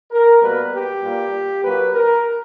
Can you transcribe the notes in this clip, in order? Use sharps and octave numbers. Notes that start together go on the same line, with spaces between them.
A#4
B2 G3 A#3 B4
G4
A#2 G3 A#3
A#2 F#3 A#3 B4
A#4